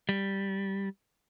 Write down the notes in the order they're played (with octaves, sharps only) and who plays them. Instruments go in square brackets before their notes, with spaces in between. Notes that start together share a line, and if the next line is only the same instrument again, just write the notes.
[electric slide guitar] G3